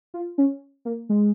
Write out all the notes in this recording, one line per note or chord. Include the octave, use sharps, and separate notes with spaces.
F4
C#4
A#3
G#3